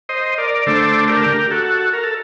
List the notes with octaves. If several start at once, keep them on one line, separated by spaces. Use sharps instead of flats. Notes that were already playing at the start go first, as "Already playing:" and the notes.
C5 D#5
A#4 D5
D3 A3 D4 A4 C5
G4 A#4
F#4 A4
A#4
A4